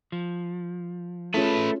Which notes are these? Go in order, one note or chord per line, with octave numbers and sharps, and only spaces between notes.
F3
A3 C#4 F4 G#4 A4 B4